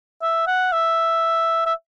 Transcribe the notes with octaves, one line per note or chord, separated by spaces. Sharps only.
E5
F#5
E5
E5